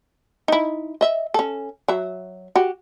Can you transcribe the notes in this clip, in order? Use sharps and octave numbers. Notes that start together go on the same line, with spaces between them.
D#4 E4
D#5 E5
C#4 A4
F#3 E5
F#4 G4